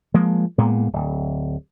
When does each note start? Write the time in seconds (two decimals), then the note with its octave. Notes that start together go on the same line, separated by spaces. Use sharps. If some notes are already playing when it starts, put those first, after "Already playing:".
0.14 F3 G#3 A#3
0.58 A2 G#3 A#3 B3
0.93 D1